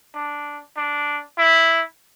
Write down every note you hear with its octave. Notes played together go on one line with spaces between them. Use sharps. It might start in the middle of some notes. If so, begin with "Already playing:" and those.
D4
D4
E4